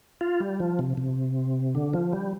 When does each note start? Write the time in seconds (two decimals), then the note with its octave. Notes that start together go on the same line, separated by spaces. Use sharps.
0.21 F4
0.40 G3
0.60 F3
0.79 C3
0.97 C3
1.75 D3
1.93 F3
2.13 G3